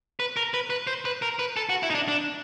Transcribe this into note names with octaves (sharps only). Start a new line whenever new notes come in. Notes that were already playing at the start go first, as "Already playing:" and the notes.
B4
A#4
B4
B4
C5
B4
A#4
B4
A4
F#4
E4
D#4
D4
D4